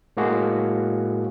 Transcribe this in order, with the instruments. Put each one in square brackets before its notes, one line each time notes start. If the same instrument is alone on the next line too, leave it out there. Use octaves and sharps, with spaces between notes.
[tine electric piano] A2 G#3 A#3 F#4 G#4